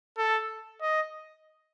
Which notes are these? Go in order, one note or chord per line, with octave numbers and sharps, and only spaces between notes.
A4
D#5